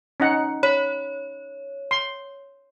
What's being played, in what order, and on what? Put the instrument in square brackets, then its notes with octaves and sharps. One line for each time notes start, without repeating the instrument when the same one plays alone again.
[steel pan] C#4 D#4 F#5
[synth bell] C#5 [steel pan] B5
[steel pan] C6